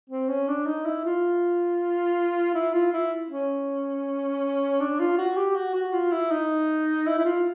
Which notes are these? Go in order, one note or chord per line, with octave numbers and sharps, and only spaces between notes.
C4
C#4
D4
D#4
E4
F4
E4
F4
E4
C#4
D4
F4
F#4
G4
F#4
F#4
F4
E4
D#4
E4
E4
F4